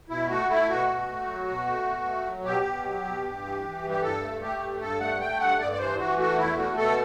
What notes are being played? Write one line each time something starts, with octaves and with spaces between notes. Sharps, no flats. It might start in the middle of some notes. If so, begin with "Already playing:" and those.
B2 E4
A3 F#4
A3 E4
B2 F#4
B2
A3
F#3
B2
A3
B2
A3
F#3
B2 G4
B2
F#3
B2
G2
E3
E3
G2
G4
G2 A4
A3
A3 G4
G2
G2 A4
A3 F#5
A3 G5
G2 F#5
G2 D5
D5
E3 C5
E3 F#4
A3 F#4
E2 E4
A3 F#4
B2 A4